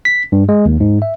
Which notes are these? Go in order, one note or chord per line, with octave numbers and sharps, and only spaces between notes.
B6
G2
G#3
D#2
G#2
E5